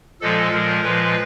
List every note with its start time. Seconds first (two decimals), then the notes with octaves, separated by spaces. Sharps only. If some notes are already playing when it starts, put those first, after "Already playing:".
0.21 A#2 F3 G#3 A4
0.52 A#2 F3 G#3 A#4
0.83 A#2 F3 G#3 B4